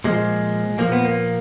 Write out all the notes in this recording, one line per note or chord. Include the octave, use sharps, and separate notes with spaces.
A#2 F3 G#3
A#2 F3 A#3
B3
A#3